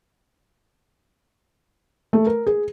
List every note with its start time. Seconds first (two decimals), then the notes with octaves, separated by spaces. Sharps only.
2.13 A3
2.27 A#4
2.47 G#4